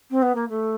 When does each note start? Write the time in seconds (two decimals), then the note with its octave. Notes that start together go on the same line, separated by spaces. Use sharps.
0.10 C4
0.22 B3
0.35 A#3
0.49 A3